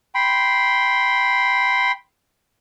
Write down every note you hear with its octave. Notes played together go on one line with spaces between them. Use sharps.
G5 B5 C6